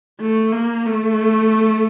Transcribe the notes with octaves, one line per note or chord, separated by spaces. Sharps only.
A3
A#3
A3